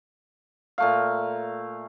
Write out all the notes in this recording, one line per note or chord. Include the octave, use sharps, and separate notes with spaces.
A#2 A3 F5